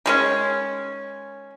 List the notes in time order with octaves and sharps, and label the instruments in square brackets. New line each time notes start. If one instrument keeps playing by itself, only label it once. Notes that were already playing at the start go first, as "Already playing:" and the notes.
[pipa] D#3 G#3 C#4